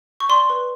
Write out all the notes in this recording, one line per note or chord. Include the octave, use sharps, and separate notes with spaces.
C#6
D5 C6
B4